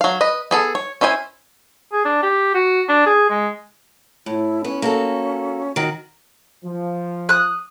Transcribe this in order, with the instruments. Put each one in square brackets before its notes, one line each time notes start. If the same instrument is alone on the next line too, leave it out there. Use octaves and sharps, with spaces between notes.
[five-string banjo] F#3 F5
B4 D#5
B3 G#4 A4
C#5
C#4 E4 C5 E5 G#5
[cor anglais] G#4
D4
G4
F#4
D4
G#4
G#3
[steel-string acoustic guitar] A2 [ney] E4
[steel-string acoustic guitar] B3 [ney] C#4
[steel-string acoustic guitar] A#3 F#4 A4
[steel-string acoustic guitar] D#3 F#4 [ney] D#4
[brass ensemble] F3
[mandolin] D#6 F#6